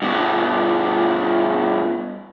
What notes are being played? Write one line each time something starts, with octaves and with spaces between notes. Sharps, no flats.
G2 B2